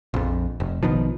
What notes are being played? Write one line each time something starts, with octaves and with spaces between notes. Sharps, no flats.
A#1 F2
F1
A#1 B2 D#3 F3